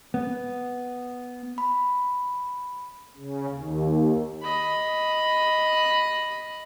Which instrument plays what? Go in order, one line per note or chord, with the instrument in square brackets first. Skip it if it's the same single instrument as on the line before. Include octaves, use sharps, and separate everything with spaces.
[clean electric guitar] B3
[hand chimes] B5
[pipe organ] C#3
D#2
[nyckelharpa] D#5 B5